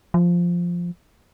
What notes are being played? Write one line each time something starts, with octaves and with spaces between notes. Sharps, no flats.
F3